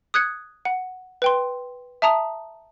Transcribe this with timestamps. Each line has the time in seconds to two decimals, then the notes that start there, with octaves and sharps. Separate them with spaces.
0.14 D#6 F#6 G#6 C#7
0.65 F#5
1.22 B4 G5 C6
2.02 E5 A5 A#5 D#6